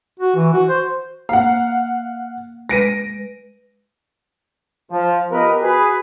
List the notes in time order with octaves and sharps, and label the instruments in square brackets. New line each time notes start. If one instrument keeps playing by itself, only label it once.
[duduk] F#4
E3
F#4
C5
[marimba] A#3 [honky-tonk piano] F5 F#5
[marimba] G#3 B4 [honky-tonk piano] A#6 D7 D#7
[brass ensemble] F3
F3 B3 G4 A#4 B4 D#5
F#4 G#4 B4